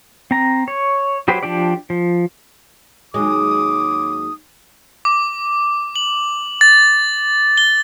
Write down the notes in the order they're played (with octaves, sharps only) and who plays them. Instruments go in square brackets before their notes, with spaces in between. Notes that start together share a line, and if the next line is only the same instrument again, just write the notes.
[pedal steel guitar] C4 A#5
C#5
F#3 G4 B4 C5
F3 D4 G4 D5
F3
[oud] D#2 F#3 G#3 [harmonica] D6 [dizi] D#6
[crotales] D6
F#7
A6
G7